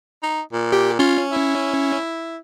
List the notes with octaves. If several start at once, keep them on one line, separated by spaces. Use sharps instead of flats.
D#4
A#2
G4
C#4 F4
E4